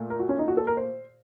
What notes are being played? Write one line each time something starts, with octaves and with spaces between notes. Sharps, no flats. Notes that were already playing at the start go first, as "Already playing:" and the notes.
Already playing: A#2 A3
A#4
F#4
C#4
D#4
F#4
A4
A#4
C5